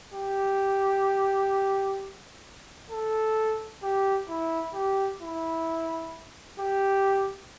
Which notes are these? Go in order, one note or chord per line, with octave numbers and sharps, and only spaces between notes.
G4
A4
G4
E4
G4
E4
G4